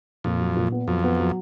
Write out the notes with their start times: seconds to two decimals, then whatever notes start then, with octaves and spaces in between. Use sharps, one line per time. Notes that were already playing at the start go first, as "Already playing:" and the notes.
0.24 F2 A#2
0.41 F#3
0.56 A#2
0.72 B3
0.88 F2 F#3
1.04 B3
1.19 F#3